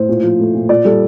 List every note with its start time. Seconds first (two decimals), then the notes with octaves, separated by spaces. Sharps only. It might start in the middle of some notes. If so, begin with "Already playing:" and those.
Already playing: A2 C5
0.09 A#2
0.23 F3
0.39 A3
0.55 A#2
0.69 A#2 D5
0.85 G3 A4